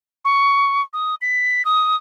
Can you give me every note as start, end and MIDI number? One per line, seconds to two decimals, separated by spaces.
0.25 0.82 85
0.93 1.15 87
1.21 1.65 95
1.65 1.96 87